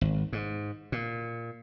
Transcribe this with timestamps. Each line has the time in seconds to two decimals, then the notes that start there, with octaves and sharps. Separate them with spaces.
0.01 G#1
0.33 G#2
0.92 A#2